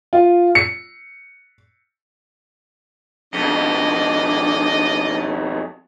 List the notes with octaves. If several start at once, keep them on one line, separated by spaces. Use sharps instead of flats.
F4
C#7
F2 B2 D4 D5 D#5